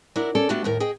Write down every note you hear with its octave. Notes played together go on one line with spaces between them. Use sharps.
F#3 D4 E4 A#4
C#4 A4 D5
A3 B3 D4 F#4 G4
D#2 A2 A#4
G#4 D#5 G5